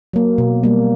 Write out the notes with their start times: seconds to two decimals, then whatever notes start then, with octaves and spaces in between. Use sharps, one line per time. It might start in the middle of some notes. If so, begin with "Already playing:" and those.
0.13 F#3 A#3
0.38 B2
0.64 G3 A#3